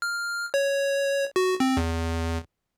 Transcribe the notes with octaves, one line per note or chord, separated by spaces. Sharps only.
F6
C#5
F#4
C4
E2